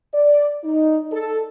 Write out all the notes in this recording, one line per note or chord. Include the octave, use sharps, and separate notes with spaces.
D5
D#4
A4